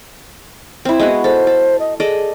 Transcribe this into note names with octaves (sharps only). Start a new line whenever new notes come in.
C4 E4
G#3 B3 F#4
A4 C5
A4
D#5
G#4 A4 D5 D#5